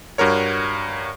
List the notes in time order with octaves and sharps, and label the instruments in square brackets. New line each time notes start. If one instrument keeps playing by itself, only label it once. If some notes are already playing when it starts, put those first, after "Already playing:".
[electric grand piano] G2 F#4 A#4 C#5